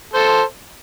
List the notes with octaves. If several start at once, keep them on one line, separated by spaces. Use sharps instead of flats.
A4 C5